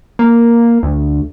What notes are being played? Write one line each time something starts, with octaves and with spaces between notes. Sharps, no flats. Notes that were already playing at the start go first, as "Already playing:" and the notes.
A#3
D2